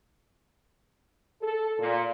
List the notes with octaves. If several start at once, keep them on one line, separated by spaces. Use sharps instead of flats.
A4
A#2